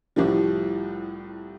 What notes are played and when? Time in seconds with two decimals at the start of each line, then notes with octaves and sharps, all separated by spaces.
0.16 C2 A2 F3 G3